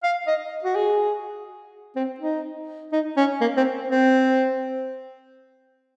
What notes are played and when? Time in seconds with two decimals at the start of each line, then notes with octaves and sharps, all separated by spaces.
0.03 F5
0.27 D#5
0.64 F#4
0.75 G#4
1.96 C4
2.20 D#4
2.92 D#4
3.17 C#4
3.41 A#3
3.57 C4
3.89 C4